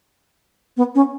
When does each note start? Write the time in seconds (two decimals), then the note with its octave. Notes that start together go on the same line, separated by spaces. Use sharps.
0.77 B3
0.95 C#4